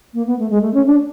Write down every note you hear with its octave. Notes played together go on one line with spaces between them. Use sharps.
A#3
B3
A3
G#3
A3
C#4
D4